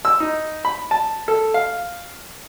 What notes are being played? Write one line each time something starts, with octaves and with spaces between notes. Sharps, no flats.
E6
D#4
B5
A5
A4
F5